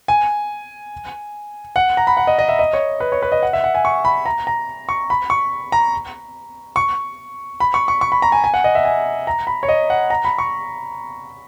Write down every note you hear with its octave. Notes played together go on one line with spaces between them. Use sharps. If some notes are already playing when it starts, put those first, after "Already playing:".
G#5
F#5
A#5
B5
F#5
D#5
D#5
E5
D#5
C#5
B4
C#5
B4
D#5
F#5
E5
F#5
G#5
C#6
B5
A#5
A#5
C#6
B5
C#6
A#5
C#6
B5
C#6
C#6
C#6
B5
A#5
G#5
G#5
F#5
D#5
E5
G#5
A#5
B5
C#5
D#5
F#5
A#5
B5
C#6